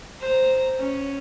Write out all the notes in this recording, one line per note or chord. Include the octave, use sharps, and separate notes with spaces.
C5 A#5
C#4